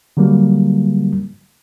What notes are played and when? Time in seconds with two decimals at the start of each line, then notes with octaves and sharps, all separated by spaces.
0.17 D3 F#3 G3 A#3